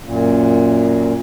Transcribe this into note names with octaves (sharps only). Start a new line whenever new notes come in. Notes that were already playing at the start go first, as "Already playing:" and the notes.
F#2 A#2